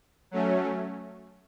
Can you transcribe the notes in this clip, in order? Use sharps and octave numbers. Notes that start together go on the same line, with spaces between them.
F#3 A3 C#4